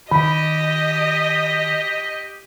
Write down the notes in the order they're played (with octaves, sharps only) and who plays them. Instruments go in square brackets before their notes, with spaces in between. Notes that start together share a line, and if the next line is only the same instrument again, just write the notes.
[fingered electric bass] D#3 [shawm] G4 [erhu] D#5 [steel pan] B5